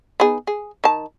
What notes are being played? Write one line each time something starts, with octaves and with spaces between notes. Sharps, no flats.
B3 D#4 G#4
G#4
D#3 A5